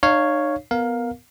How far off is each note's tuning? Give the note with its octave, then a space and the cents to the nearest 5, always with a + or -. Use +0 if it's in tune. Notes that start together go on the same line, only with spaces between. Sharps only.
D#4 -45 C#5 +0 F5 +0
B3 +0 A#4 +0 F5 +20